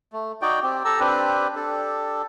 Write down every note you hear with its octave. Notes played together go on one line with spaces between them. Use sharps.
A3
D#4 F#4 D5 G5
C4 G4
G4 A4 A#5 E6
C4 D4 G4 B4
D4 G4 A4